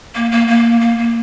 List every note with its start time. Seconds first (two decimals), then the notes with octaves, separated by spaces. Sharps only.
0.15 A#3
0.32 A#3
0.48 A#3
0.81 A#3
0.98 A#3